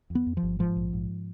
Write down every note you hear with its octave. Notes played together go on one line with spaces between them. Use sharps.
F2
B3
F2
F3
G1
G#2 F3
A#1
G#2